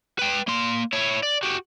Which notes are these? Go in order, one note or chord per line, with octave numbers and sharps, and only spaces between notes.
B4 G5
A#3 C6
E4 C#5
D5
F#4 G4